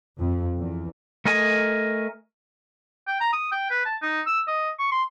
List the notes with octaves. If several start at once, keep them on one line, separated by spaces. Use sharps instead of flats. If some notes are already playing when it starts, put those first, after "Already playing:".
F2
E2
A3 A#4 D#5 G#5
G5
A#5
D#6
G5
B4
A5
D#4
E6
D#5
C#6
C6